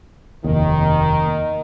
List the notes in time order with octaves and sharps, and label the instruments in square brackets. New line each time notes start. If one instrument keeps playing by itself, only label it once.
[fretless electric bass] F1 D#2 [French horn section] D#3